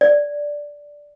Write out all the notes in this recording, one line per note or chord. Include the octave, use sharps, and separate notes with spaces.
D5